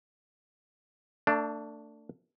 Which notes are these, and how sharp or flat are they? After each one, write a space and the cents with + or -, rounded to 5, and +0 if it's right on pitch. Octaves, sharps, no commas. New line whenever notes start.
A3 +35 D4 +0